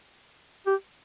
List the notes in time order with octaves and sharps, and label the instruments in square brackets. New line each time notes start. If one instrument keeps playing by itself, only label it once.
[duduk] G4